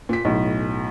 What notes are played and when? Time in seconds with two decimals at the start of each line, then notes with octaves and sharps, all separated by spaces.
0.09 A#2 B6
0.25 B1 A2